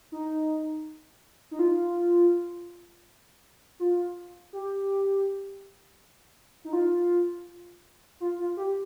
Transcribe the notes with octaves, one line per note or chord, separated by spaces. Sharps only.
D#4
D#4
F4
F4
G4
D#4
F4
F4
F4
G4